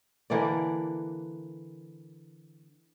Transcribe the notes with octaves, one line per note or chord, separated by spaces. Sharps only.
D3 E3 A#3 D5